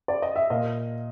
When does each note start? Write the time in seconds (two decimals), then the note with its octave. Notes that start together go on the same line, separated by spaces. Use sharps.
0.08 D5
0.22 D#5
0.36 E5
0.50 A#2 D#5 F5